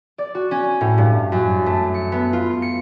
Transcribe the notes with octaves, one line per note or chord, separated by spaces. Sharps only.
D5
F#4
C#4
A2
G2
F#2
A3
C#7
B3
F4
C#7